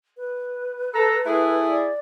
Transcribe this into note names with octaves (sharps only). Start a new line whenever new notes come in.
B4
A4 A#5
A3 E4 G#4
D5